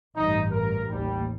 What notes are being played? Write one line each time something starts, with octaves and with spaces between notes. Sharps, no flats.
A1 G2 D#4
A#4
A1 D#2 G3